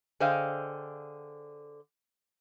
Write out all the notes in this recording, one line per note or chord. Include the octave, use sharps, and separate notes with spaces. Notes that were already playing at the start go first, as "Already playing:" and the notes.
D3 G#4 C5 D#5 F5 G5